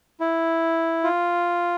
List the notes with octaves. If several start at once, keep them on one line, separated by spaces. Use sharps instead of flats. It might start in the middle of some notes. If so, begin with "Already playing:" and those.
E4
F4